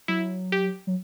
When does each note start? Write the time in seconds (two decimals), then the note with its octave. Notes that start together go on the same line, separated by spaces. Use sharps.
0.08 F#3 E4
0.52 G4
0.87 F#3